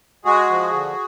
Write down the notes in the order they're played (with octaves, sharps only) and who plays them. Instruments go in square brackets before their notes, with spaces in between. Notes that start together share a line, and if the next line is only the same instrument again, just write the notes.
[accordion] G#3 F#4 G#4
F3
D3